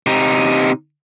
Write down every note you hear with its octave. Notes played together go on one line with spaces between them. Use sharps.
C3 D#4